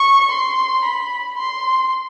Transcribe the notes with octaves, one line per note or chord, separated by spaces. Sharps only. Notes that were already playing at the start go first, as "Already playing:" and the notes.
Already playing: C#6
C6
B5
C6